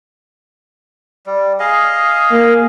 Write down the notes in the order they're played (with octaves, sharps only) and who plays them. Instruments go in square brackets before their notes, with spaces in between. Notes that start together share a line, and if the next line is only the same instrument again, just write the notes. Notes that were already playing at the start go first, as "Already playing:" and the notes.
[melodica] G3
G#4 D#5 F5
[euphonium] A#3